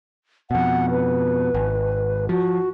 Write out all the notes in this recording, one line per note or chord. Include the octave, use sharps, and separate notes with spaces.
F2 B2 F#5
B4
G#1
F3 F#4